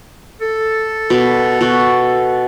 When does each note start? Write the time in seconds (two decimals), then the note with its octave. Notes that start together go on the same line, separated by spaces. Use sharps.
0.41 A4
1.10 B2 D6
1.61 B2 F#4